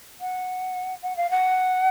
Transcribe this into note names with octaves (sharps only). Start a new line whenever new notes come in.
F#5
F#5
F5
F#5